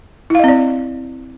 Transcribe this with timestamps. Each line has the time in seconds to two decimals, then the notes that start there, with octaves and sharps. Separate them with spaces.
0.30 E4
0.35 F5
0.39 D#5
0.44 C4
0.48 D5